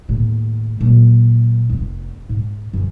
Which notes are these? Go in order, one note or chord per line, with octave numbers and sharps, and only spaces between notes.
D#2 A2
A#2 F#3
F1 B3
G#2
F#2 E3